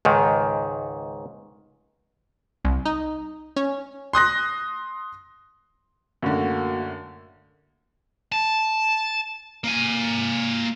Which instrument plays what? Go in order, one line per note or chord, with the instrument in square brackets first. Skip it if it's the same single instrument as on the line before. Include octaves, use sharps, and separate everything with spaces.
[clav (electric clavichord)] C#2 G#2 D#3
[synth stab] C2
D#4
C#4
[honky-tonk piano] C6 D#6 F#6 A#6
[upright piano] F#2 A2 D3 [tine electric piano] A#3 F#4
[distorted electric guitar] A5
A#3 G#5